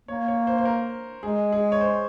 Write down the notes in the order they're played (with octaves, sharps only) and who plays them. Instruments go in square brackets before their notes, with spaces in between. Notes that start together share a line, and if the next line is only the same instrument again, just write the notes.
[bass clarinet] A#3 [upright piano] C#5
[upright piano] C#5
C5
C5
A#4
[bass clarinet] G#3 [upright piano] G#4
[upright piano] G#4
C#5
C5